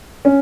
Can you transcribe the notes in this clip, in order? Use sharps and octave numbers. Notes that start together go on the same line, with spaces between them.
C#4